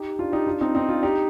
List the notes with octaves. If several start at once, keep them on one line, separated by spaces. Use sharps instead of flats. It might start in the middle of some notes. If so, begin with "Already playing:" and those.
Already playing: D#4 G4
D4 F4
D#4 G4
D4 F4
C4 D#4
C4 D#4
D4 F4
D#4 G4